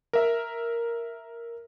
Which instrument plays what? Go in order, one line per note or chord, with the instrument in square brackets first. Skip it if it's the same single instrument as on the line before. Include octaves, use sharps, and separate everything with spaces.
[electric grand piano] A#4 E5